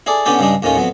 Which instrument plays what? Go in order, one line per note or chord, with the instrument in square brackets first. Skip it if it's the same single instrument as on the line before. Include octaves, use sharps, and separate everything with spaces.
[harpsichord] E4 G#4 A4 D5
D3 B3 C#4 D4 G4 A4
G2 C#3 G3 G#3 D4
D#2 A2 D#3 C#4 F4
F2 F#3 B3